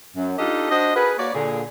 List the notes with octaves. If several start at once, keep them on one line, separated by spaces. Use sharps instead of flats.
F#2
D4 D#4 F4 G4 A4 D#5
D4 F#4 C5 D#5
F#4 G#4 A#4 B4
A#3 F#4 C#5 D5
A#2 D3 G#4